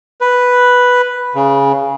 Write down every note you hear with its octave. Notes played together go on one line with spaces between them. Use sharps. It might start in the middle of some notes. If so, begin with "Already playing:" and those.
B4
C#3